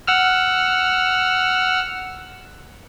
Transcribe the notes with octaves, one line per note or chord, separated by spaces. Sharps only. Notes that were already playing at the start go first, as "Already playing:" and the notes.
F#5 E6 F6